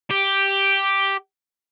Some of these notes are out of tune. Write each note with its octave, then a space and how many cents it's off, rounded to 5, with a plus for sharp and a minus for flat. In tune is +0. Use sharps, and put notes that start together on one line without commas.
G4 +0